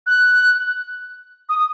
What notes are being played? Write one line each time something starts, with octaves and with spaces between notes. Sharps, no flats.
F#6
D#6